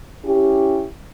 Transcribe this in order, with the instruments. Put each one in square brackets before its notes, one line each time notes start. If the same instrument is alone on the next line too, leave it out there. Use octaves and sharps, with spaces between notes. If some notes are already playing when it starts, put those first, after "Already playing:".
[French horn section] C#4 E4 G4